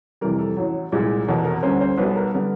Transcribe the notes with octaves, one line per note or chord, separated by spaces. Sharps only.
F2 C3 E3 G3 A#4
A4
A1 A2 F#3
C2 A#2 F3 G#3
F1 E2 B2 F#3 A#3
A#4
D2 D3 G3 A#3 C#4 C5
C5
B1 B2 G3 B3 B4
A#4
D3 G3 B3